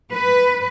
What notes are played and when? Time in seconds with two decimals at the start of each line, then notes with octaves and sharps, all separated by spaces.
0.12 B4